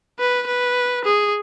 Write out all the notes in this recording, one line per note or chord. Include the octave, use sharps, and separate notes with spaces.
B4
B4
G#4